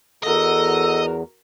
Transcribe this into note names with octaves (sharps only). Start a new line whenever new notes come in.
E2 F#4 A4 A#4 D#5